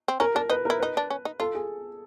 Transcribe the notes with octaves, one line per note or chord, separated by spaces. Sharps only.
C4
C#4 A#4
D4 A#4
D#4 B4
E4 A#4
D#4 B4
D4
C#4
D#4
F4 A4
G#4